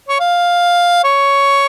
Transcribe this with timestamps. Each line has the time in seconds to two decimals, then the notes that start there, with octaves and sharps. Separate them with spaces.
0.09 C#5
0.20 F5
1.04 C#5